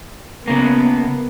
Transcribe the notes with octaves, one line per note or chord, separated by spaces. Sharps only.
C#3 A#3 B3